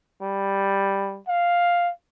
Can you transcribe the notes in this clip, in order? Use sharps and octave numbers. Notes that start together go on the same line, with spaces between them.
G3
F5